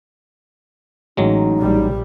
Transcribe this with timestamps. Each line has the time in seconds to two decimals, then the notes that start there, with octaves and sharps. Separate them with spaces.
1.17 A1 F#3 G#3 D#4
1.59 A#1 A#2 G3